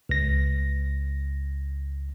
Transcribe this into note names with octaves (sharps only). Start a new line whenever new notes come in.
C#2 A#6